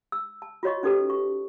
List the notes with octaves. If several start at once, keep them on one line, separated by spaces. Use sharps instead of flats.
E6
A5
F4 F#4 C#5 D#5 C#6
C#4 D#4 G4 A4 B4 A5
C#6